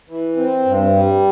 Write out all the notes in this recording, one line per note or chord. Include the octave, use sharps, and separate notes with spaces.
E3
C4
G2
G3